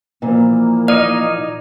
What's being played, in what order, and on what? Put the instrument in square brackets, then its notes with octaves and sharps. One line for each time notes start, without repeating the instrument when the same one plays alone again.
[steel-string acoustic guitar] A#2 E3 F3 [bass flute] A#3
[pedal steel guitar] D#4 D#5 F5 [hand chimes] D5